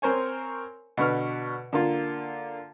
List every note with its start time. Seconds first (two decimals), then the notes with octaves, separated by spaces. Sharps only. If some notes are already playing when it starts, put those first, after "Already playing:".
0.02 C4 A#4 C5 C#5 G#5
0.97 B2 D3 B4 C#6 F6
1.73 D3 A#3 F4